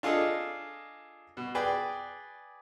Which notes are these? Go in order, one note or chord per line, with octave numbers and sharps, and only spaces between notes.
D4 F4 G#4 A4 D#5
B2
G#4 B4 D5 G5